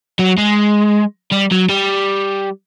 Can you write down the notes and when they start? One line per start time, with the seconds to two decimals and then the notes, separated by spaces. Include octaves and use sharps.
0.19 F#3
0.38 G#3
1.31 G3
1.51 F#3
1.69 G3